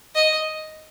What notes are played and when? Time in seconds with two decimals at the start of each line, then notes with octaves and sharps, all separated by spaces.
0.15 D#5